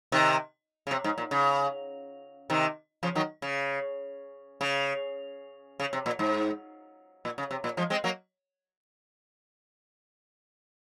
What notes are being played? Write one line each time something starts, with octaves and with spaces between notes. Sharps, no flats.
C3 D#3
C#3
C3
G#2
A#2
C#3
C3 D#3
C#3 F3
D#3 F#3
C#3
C#3
C#3
C3
A#2
G#2
A#2
C#3
C3
A#2
F3 G#3
G#3 C4
F#3 A#3